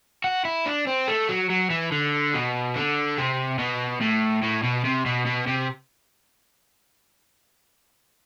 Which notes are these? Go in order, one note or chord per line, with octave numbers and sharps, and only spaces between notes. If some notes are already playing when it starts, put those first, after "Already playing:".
F#4
E4
D4
C4
A3
F#3
F#3
E3
D3
B2
D3
C3
B2
A2
A2
B2
C3
B2
B2
C3